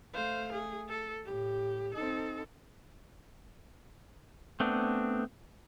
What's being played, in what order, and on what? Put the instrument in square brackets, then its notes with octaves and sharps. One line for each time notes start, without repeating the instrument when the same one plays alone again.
[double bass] A3 [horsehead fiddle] C5 F5
[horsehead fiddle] G#4
A4
[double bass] A2 [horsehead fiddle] G4
[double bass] C4 D#4 [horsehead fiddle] A4
[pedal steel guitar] A3 B3 C4 D4